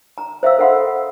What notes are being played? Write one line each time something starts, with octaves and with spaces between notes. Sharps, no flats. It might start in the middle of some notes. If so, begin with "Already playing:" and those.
A#5
C5 E5 F5 E6
A4 C5 F5 F#5 B5 C6